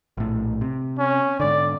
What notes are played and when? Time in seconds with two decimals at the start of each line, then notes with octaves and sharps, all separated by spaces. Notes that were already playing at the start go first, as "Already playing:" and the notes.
0.17 A#1 A2
0.61 C3
0.98 C#4
1.40 G#2 D3 D5